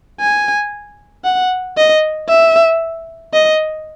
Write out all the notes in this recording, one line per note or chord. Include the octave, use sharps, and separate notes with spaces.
G#5
F#5
D#5
E5
D#5